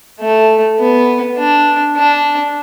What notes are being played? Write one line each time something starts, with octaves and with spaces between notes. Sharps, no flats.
A3
B3
D4
D4